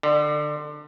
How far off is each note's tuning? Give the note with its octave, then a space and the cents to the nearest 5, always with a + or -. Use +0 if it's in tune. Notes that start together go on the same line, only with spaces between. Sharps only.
D3 +25